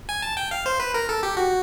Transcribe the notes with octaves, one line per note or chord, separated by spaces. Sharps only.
G#5
A5
G5
F5
C5
B4
A#4
A4
G4
F#4